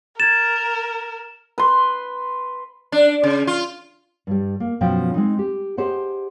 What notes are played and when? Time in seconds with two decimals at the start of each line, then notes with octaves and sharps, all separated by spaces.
0.20 A#4 G#6 A6 E7
1.58 B4 C6
2.92 D4
3.23 C#3
3.47 F4
4.27 G2 G3
4.60 A#3
4.81 F#2 B2 F3 F4 G5
5.14 G#3 C4 D#4
5.39 G4
5.77 G4 G#4 C5 D#5 F#5